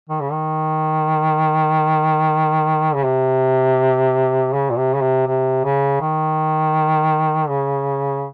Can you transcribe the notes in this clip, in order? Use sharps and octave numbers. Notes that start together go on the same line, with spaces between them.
D#3
C#3
D#3
C#3
C3
C#3
A#2
C3
C#3
C3
C3
C#3
D#3
C#3